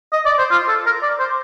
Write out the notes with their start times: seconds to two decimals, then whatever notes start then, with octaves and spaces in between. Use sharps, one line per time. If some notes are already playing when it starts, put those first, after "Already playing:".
0.13 D#5
0.26 D5
0.39 C5
0.51 F4
0.68 A4
0.86 A#4
1.03 D5
1.20 C5